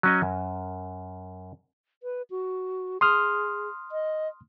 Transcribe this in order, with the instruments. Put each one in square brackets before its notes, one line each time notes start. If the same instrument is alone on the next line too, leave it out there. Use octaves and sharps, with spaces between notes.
[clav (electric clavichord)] F#3 C#4 D#5
F#2
[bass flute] B4
F#4
[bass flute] G#4 [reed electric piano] C6 D#6 F6
[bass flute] D#5